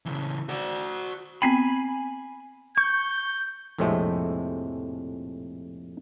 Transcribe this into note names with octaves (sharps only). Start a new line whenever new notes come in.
C#3 E3
F#4 D5
B3 C4 G5 G#5 B5
C#6 G6
A#1 F2 A2 C3 G#3 A3